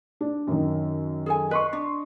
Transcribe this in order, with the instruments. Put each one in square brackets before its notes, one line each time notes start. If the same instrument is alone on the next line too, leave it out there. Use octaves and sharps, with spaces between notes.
[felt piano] D4
F#2 D#3
[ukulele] G#4 A4 G#5
[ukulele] B4 [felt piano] D#5 C6 C#6
[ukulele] D4